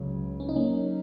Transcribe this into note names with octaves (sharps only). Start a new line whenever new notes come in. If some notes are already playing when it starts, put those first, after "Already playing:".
Already playing: C#2 C#3 F#3
C#4
D#4
A#3 C#4